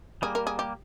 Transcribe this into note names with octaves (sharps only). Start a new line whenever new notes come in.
G3 A#3 G#4
A#4
G#4
G4